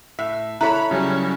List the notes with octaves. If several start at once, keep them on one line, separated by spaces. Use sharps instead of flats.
A2 E5
E4 A4 C#5 A#5 B5 F#6
C#3 F#3 G3 C#4